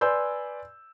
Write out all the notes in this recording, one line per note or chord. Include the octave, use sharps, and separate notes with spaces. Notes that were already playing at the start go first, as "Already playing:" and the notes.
B4 D5 G#5 C6 E6 G6